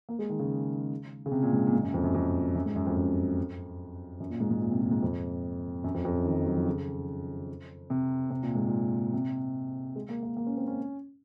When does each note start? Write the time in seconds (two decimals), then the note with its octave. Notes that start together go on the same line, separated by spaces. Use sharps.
0.09 A#3
0.19 G#3
0.30 D#3
0.39 C#3
1.26 C#3
1.32 C3
1.43 A#2
1.53 G#2
1.67 A#2
1.73 G#2
1.83 F#2
1.94 F2
2.04 F#2
2.14 F2
2.55 F#2
2.66 G#2
2.76 F#2
2.86 F2
2.96 F#2
4.20 F#2
4.30 A#2
4.40 G#2
4.51 G#2
4.61 A#2
4.71 C3
4.81 A#2
4.91 G#2
5.02 F2
5.84 F#2
5.94 F2
6.05 F2
6.15 F#2
6.25 D#3
6.36 F3
6.46 F#3
6.56 F3
6.66 C#3
7.90 C3
8.30 C3
8.43 A#2
8.55 G#2
8.67 A#2
9.13 C3
9.96 G#3
10.09 A#3
10.23 A#3
10.37 A#3
10.47 C#4
10.57 C4
10.67 C#4